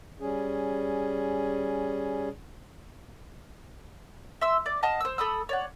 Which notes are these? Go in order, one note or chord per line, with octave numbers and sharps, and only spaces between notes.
G3 C#4 G#4
E5 C6 E6
D5
D#5 F5 F#5 A5
C5 E6
A4 B5 D#6 E6
C#5 D5 F#5